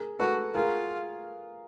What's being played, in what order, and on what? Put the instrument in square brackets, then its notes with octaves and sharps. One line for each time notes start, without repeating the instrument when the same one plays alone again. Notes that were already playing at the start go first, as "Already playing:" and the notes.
Already playing: [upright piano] G#4 A#4
[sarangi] F#4 [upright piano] A4 B4
[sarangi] F4 [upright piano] G#4 A#4